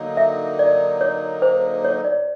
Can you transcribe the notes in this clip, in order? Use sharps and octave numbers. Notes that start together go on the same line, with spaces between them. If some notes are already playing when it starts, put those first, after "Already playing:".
Already playing: D3 F#3 A#3 D#4
E5
D5
C#5
C5
C#5
D5